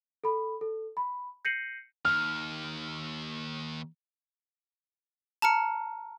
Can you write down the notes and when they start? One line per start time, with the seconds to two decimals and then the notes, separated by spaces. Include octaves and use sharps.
0.24 A4 B5
0.61 A4
0.97 B5
1.45 G6 A#6 C7 C#7 D#7 F#7
2.05 D#2 F6
5.42 A5 A#5 F6 C#7